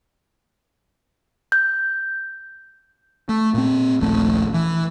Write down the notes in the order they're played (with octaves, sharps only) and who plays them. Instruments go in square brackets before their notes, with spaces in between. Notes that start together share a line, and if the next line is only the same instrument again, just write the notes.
[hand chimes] G6
[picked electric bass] A3
A#2 C4
D#1 A#1 A3
E3